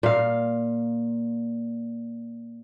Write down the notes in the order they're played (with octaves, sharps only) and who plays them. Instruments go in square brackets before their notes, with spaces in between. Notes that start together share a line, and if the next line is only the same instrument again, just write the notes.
[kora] A#2 F5